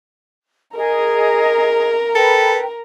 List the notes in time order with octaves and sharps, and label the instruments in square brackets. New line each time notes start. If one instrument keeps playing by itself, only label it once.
[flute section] G#4 D#5 [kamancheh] A#4 A#5
[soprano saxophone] A4 [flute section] B4 G5